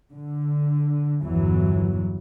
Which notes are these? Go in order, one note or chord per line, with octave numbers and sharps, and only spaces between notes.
D3
G1 E2 E3 F#3